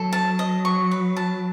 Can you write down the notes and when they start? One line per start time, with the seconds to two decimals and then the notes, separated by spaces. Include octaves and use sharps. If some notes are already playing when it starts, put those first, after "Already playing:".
Already playing: F#3 A4
0.13 A5
0.39 D#5
0.65 C#6
0.91 B4
1.17 A5